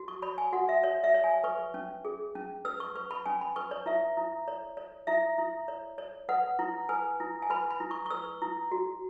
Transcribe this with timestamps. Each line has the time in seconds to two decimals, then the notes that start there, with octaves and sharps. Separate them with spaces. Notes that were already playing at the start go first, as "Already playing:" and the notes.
Already playing: F#4
0.08 C#6
0.22 C#5 B5
0.38 G#5
0.53 F#4 F#5
0.69 E5
0.84 C#5
1.04 E5
1.14 C#5
1.24 G#5
1.44 B4 C#6
1.74 C#4
2.05 G#4
2.35 C#4
2.65 B4 E6
2.80 C#6
2.95 B4 C#6
3.11 B5
3.26 C#4 G#5
3.41 B5
3.56 B4 C#6
3.71 C#5
3.86 E4 E5
4.17 E4
4.48 C#5
4.77 C#5
5.07 E4 E5
5.38 E4
5.68 C#5
5.98 C#5
6.29 B4 F#5
6.59 E4
6.89 B4 G#5
7.20 E4
7.42 G#5
7.50 B4 B5
7.71 B5
7.80 E4
7.91 C#6
8.06 C#6
8.10 B4 E6
8.42 E4
8.72 F#4